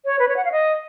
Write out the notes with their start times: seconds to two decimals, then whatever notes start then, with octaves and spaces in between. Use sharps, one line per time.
0.05 C#5
0.19 B4
0.29 C#5
0.36 F#5
0.45 F5
0.52 D#5